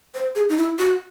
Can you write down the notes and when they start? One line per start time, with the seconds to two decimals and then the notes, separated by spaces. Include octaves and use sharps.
0.14 C5
0.35 G#4
0.49 D#4
0.57 E4
0.78 F#4